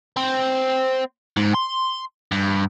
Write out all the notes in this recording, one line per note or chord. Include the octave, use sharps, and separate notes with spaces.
C4
G#2
C6
G2